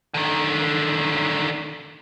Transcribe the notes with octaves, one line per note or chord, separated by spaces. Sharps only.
D3 D#3